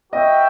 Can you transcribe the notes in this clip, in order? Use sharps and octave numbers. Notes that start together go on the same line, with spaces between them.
F#4 B4 D#5 E5 G5